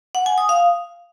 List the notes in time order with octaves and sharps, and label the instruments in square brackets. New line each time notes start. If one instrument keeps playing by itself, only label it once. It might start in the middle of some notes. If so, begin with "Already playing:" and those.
[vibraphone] F#5
G#5
D#6
F5